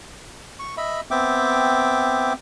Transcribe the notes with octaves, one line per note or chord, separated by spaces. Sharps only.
C#6
D#5 E5 B5
B3 C4 E5 G5 D6